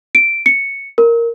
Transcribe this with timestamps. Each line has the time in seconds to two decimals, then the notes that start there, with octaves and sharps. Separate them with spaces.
0.15 D7
0.46 C#7
0.98 A#4